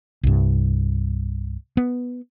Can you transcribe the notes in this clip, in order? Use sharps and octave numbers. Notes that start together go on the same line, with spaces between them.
C2 G2
B3